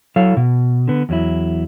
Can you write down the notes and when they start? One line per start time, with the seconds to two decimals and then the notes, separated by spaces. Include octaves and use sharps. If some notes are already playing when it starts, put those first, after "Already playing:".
0.16 F#3 E4 A4 C#5 F5
0.37 B2
0.88 D3 B3
1.09 E2 F#3 E4